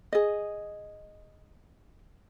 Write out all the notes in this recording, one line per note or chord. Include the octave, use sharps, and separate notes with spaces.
G#4 D#5